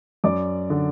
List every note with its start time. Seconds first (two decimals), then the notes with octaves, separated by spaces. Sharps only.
0.24 F#2 D5 D6
0.70 D3